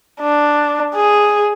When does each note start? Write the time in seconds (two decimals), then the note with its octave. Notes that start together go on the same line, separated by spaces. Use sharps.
0.21 D4
0.95 G#4